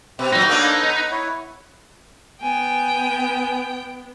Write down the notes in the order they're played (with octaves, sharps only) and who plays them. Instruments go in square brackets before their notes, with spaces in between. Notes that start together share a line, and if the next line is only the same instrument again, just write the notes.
[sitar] B2 [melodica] C4 B4 E5
[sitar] A#2 F#3 [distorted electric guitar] D#4
[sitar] A#3 B3 D4 [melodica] A4 B4 C#5
[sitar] B3
[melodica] E4 C#5
[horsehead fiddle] B3 [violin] G5 [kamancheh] G#5